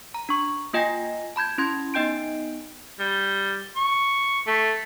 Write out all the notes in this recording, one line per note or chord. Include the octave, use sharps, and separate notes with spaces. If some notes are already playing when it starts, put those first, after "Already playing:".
A#5
D4 C#6
A#3 F4 D#5 G5 G#5 A#6
A5 B5 G6 G#6
C#4 E4 C6 G#6
B3 D#4 D#5 G5 G6 D7
G3
C#6
A3